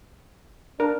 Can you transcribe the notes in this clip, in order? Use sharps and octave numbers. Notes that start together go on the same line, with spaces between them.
D4 A#4